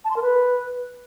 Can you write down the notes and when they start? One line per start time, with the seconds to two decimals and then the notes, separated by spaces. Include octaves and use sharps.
0.05 A5
0.10 C6
0.16 A#4
0.22 B4